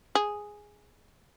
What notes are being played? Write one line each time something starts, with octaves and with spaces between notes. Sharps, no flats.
G#4